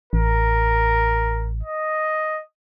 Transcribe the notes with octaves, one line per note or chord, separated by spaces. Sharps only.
A1 A#4
D#5